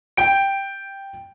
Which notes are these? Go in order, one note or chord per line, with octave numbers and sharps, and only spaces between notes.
G5 D7